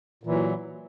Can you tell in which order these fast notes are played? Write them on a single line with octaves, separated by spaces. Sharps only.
A#2 E3 F#3